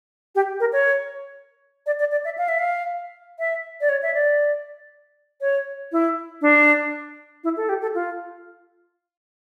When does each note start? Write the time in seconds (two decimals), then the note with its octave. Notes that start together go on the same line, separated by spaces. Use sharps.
0.35 G4
0.60 A#4
0.72 C#5
1.86 D5
2.00 D5
2.12 D5
2.25 E5
2.38 F5
2.48 E5
2.59 F5
3.39 E5
3.81 D5
3.89 C#5
4.03 E5
4.14 D5
5.41 C#5
5.92 E4
6.42 D4
7.44 E4
7.57 A4
7.69 G4
7.82 A4
7.95 F4